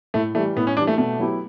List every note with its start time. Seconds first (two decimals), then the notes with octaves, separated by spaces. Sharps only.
0.14 A2 A3
0.35 E3 G3 A3
0.56 A2 B3
0.67 C#4
0.77 E3 G3 D4
0.87 A3
0.98 B2 A3
1.19 F#3 B3 E4 G4